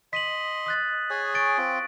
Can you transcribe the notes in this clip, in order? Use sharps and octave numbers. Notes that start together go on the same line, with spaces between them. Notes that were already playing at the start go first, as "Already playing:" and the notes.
D#5 C6 B6 D#7 F#7
D#6 F#6 A6
G#4 C#5 G#5
C#6 A6 D7
C4 F4